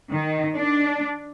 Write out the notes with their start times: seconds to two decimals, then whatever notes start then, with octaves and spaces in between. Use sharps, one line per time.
0.12 D#3
0.56 D4